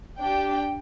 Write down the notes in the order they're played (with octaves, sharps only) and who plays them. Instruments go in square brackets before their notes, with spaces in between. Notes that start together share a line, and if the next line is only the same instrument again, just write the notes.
[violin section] D4 G4 G5